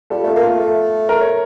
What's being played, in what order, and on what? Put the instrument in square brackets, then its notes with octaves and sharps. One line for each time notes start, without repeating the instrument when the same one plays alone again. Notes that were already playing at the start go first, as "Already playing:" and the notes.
[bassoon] G3 [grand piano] F4 A4
[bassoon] A3 [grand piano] F4 A4
[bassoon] A#3
[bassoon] A3 [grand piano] F4 A4
[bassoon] A3
[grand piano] A#4
C#5